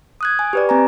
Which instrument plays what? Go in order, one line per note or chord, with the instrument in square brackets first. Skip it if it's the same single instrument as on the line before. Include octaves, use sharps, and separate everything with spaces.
[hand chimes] D#6 F#6 G#6
G#5
G4 B4 D5
C4 G#5 A#5